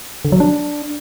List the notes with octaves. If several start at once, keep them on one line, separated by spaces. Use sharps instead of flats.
D3
F#3
D4